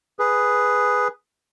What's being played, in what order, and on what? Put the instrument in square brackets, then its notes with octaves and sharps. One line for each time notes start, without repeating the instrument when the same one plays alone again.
[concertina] G#4 B4